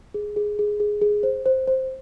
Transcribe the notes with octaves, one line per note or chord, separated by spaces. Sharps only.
G#4
G#4
G#4
G#4
G#4
C5
C5
C5